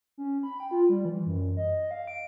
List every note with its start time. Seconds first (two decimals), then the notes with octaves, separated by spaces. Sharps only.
0.18 C#4
0.43 B5
0.60 G5
0.71 F4
0.89 G3
1.05 E3
1.26 F#2
1.57 D#5
1.91 F5
2.07 D7